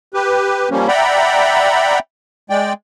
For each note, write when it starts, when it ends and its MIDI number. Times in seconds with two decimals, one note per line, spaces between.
0.14 0.69 67
0.14 0.69 71
0.71 0.87 53
0.71 0.87 55
0.71 0.87 58
0.71 0.87 61
0.88 1.99 74
0.88 1.99 76
0.88 1.99 78
0.88 1.99 79
0.88 1.99 82
0.88 1.99 83
2.50 2.73 56
2.50 2.73 74
2.50 2.73 79